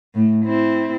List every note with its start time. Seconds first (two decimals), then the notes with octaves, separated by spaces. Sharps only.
0.15 A2 A3
0.45 C4 E4